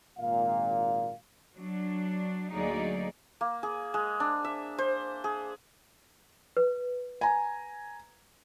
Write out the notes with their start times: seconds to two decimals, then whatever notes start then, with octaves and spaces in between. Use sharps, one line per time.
0.19 G#1 A#2 F5
1.55 F#3 D4
2.52 D2 F#3 A#3 D#4 G#4 D5
3.41 A#3
3.63 G#4
3.94 G#3
4.20 D4
4.45 E5
4.78 C5
5.24 G#4
6.57 B4
7.21 G#5 A#5